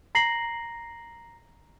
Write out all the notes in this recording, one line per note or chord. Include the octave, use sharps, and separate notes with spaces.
A#5 A#6 C7 F#7